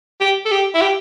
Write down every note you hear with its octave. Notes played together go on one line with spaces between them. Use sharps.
G4
A4
G4
E4
G4